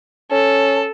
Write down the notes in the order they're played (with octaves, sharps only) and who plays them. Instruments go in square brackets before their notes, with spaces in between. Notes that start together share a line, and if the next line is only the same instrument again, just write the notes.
[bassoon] C#4 [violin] A4